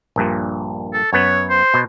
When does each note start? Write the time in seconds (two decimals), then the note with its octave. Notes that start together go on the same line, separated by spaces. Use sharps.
0.16 A#1 G2 A#2
0.93 A4
1.13 F#2 B3 C#5
1.50 C5
1.74 B2